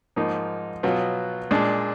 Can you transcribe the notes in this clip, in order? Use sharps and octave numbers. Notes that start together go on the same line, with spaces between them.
G#2 F3 A#3 D#4
B2 F#3 B3 F4
A#2 G#3 D4